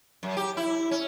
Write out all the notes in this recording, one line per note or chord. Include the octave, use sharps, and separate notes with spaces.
F#2
G4
E4
C#4